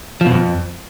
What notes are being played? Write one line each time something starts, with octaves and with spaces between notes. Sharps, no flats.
F3
B2
F2